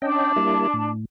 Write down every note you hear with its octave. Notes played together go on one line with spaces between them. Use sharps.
C#4 D4 D#5 G5 A5
G3 A#3 E4
A2